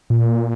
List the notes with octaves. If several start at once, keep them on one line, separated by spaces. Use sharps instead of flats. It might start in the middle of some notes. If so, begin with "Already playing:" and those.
A#2